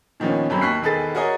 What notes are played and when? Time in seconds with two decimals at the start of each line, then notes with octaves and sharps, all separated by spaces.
0.20 A#2 D#3 F3 B3 C#4
0.50 G1 F#2 F#3 C4 B5
0.61 D#2 C#6 F#6 B6 C7
0.82 E1 D#3 G#4 A4 B4 A6
1.15 F#4 G#4 A#4 C#5 D#5 G#5